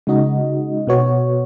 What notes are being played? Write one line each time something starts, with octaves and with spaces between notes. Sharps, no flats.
C#3 G#3 D#4 F#4 D#5
B2 B3 F#4 C#5